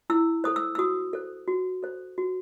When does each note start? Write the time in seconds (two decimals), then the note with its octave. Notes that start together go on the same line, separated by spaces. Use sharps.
0.10 E4 E6
0.44 A4 C5 D#6
0.56 E6
0.75 E6
0.78 F#4 D#6
1.13 A4 C5
1.48 F#4
1.83 A4 C5
2.18 F#4